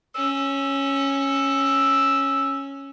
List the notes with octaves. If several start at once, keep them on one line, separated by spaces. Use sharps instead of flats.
C#4 E6